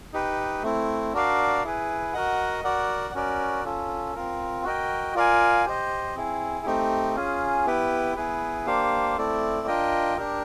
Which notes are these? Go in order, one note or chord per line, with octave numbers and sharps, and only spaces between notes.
D#4 G4 B4
A3 C4 E4
D4 F#4 A#4 D5 F5
E4 G#4 B4
F#4 A#4 D#5 F#5
F#4 A#4 D5 F#5
C#4 F#4 A#4 D5
C#4 F4 A4
C4 F4 A#4
F#4 A#4 D#5 G5
F4 A#4 D5 F5 G#5
G4 C5 D#5
C4 E4 G#4
A3 C4 D#4 G4
C#4 F4 G#4
B3 E4 G4 B4
B3 E4 G#4 B4
A#3 D4 G4 C5 F5
A3 C4 E4 A4 D5
D4 F4 A#4 D#5 G5
D4 G4 A#4